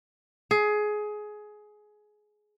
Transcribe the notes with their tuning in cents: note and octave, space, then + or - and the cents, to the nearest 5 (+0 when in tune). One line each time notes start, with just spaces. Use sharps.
G#4 +20